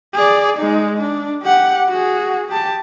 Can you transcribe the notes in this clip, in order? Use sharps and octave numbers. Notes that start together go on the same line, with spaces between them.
G#4 D5
G#3 D#4
D4
G4 F#5
F#4 G#4
G4 A5